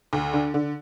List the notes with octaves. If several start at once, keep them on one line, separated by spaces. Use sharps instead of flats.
D2
D3
D3